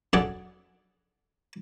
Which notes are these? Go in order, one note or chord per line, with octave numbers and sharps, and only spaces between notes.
F#2 D4 G#4 A4 D5 F#5